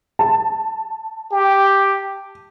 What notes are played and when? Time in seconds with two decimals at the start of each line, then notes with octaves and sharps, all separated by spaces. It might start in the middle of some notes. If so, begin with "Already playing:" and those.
0.19 A5
1.32 G4